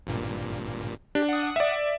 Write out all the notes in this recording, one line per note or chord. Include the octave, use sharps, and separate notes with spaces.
G#1 G2 A#2
D4 G4
F#5 D#6
D5 E5